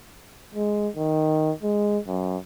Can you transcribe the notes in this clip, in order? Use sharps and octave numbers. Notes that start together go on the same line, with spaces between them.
G#3
D#3
G#3
F#2